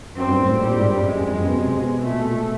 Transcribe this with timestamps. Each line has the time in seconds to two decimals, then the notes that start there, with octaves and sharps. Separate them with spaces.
0.16 F#2 C4
0.28 G2
0.39 A2
0.51 A2
0.63 A#2 G3
0.75 G#2
0.87 G2
0.98 F#2
1.09 F#2 G#3
1.22 F2
1.33 F#2
1.44 B2
1.56 C3
1.80 B2
2.02 A#2 A3
2.15 B2
2.27 A#2